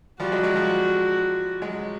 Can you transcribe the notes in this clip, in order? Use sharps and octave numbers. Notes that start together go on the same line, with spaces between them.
F3 G3 F#4
F#3 G#3
F#3 G#3
F3 G3
F#3 G#3